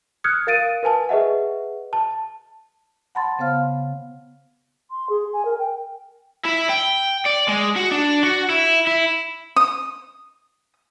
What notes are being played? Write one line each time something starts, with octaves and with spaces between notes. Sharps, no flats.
D#6 F6 F#6 G#6 C#7
A#4 F5 A6 D7 D#7
A#4 B4 G#5 A5
G#4 B4 D#5 E5 F#5
A5
F#5 A5 B5 C6 A6
C#3 B3 C5 F5 F6
C6
G#4
G#5
A#4
G5
E4
G5
D5
G#3
F#4
D4
F#4
E4
E4
D#6